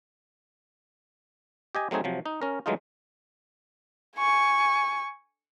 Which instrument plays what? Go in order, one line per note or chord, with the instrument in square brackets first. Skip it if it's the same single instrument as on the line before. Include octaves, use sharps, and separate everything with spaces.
[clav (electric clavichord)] G4 D#5 G#5
F#3 A3 C4 D#4 G#4
C3 F3 F#3
D#4
C#4 A#4
E3 F#3 G#3 A3 D#4 F4
[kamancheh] G#5 C#6